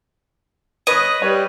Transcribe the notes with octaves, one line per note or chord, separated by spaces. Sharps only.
B4 C#5 D#5 D#6
G3 C#5